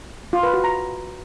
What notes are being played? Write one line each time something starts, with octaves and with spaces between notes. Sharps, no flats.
F4
B4
F#4
A#5